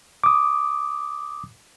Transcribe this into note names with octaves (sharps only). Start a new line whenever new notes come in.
D6 D#6